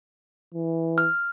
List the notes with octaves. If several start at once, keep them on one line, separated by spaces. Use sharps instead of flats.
E3
F6